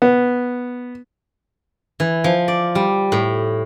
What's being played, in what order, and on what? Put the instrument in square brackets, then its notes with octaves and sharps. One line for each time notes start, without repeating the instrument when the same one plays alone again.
[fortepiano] B3
[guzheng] E3
F3
D5
G3
A2